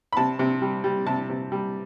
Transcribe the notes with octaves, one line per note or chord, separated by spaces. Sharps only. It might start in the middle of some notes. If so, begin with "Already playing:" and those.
B5
C3 A5
C3
G3
G3
C3 A5
C3
G3